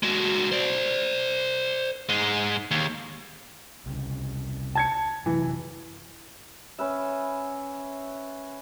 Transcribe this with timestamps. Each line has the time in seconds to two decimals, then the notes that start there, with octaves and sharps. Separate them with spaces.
0.03 G#3 F#4
0.51 C5 D5
2.09 G#2 G#3
2.71 D#2
3.86 C2 C#3
4.75 A5 G#6 C#7
5.26 F#2 C3 E3 F#3
6.79 C#4 B4 E5